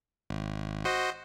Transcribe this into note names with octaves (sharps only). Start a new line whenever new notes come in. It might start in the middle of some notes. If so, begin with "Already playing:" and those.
G#1
F#4 C5 D#5